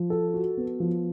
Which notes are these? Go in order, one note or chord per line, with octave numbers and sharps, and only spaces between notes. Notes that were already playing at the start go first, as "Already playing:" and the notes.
Already playing: F3
A4
F#4
B3
F3